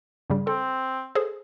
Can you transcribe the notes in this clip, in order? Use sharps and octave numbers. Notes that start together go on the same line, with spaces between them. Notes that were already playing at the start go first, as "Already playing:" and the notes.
G2 C#3 G3
C4 A4
G#4 A4 C5